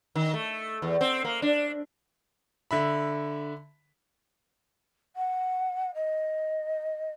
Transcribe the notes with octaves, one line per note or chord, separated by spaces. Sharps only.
D#3
A3
E2
C4
A#3
D4
D3 E5 B5
F#5
D#5